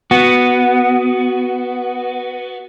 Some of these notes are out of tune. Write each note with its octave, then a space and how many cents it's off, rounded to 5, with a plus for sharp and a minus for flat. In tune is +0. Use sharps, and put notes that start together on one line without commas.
B3 +0 F#4 +0